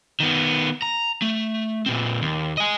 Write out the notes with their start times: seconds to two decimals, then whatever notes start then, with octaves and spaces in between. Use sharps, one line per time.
0.20 D#3 B3
0.82 A#5
1.22 A3
1.86 A#2 C4
2.22 D#2
2.57 D#5 G#5